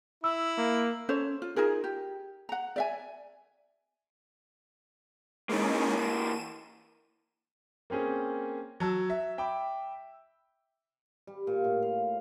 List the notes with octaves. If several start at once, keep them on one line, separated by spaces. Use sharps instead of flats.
E4 E6
A#3
C#4 A4 C5 C#5
F4
D#4 F4 G#4 A#4
G4
F#5 A#5
D5 E5 G#5
E3 G#3 A#3 C#4 D#4
D#7 E7
A#3 C4 C#4 G#4
F#3 A5 E6
E5
E5 G5 B5 D6
G3
A#2
A2
F5